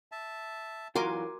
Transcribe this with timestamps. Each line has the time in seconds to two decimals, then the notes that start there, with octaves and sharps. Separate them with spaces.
0.12 E5 A5
0.95 F#2 E3 F4 F#4 A#4 G#5 C6 D6